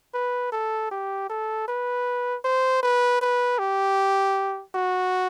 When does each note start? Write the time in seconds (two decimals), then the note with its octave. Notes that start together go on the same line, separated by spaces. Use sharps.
0.14 B4
0.52 A4
0.91 G4
1.29 A4
1.68 B4
2.44 C5
2.83 B4
3.21 B4
3.59 G4
4.75 F#4